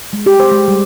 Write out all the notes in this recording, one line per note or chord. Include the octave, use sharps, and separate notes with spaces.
G#3
G4
C5
G#3
G3